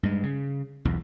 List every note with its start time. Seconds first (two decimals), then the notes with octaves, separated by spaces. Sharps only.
0.03 G2 G#3
0.23 C#3
0.85 B1 E2